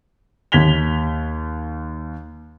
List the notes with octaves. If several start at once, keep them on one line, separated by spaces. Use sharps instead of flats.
D#2 G#6 B6 F7 G7